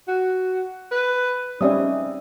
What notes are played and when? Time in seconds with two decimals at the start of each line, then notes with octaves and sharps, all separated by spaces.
0.08 F#4
0.91 B4
1.61 G3 C4 C#4 D#4 D5 E5 D#6